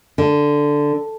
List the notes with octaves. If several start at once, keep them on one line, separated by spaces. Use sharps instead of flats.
D3